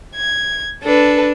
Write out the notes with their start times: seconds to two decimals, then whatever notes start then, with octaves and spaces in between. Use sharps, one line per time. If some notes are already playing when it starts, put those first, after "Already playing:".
0.15 G#6
0.84 D4 A4 B4